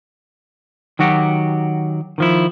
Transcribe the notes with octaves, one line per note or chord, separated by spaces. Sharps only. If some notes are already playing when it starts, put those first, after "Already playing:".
D#3 F#3 F#4 G4
D#3 F3 E4